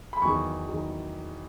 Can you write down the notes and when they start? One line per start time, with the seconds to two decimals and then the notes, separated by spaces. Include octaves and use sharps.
0.13 B5
0.22 E2 D#3 F#3 C#6
0.69 D#3 F#3